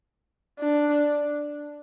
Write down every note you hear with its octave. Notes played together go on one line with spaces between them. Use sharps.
D4